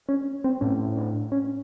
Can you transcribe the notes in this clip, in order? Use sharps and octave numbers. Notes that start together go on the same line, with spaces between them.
C#4
C4
A2 C#4
D4
C#4